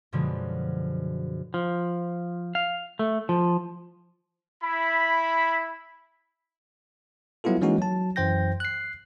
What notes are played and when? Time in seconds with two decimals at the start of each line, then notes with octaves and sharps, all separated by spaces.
0.12 F#2 B2 D3 F3 G#3
1.54 F3
2.55 F5
2.99 A3
3.29 F3
4.63 E4 B5
7.44 F#3 G3 B3 E4 F4 A4
7.61 E3 G#3 A#3 C#4 D#4 F#4
7.78 F#3 A5
8.16 F#2 E3 C5 G5 G6 A#6
8.60 F#6 C7